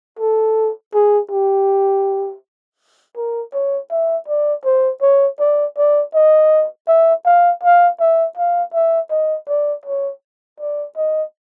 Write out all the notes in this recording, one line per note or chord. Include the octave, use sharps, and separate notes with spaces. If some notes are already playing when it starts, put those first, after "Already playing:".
A4
G#4
G4
A#4
C#5
E5
D5
C5
C#5
D5
D5
D#5
E5
F5
F5
E5
F5
E5
D#5
D5
C#5
D5
D#5